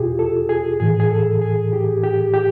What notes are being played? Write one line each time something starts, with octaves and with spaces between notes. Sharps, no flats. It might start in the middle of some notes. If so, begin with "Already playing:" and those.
Already playing: E2 B2 E4 F4 G4 G#4
A4
G#4
A2 E3 G#4
G#4
A4
G#4
G4
G4
G4